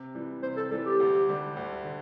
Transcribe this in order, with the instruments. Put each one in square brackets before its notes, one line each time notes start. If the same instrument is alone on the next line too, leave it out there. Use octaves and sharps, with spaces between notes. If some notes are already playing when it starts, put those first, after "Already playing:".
Already playing: [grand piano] C3
E3 G3
[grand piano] C3 [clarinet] C5
[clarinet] A4
[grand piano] E3 G3 [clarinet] A4
[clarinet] G4
[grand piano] D2
D3 G3
D2
D3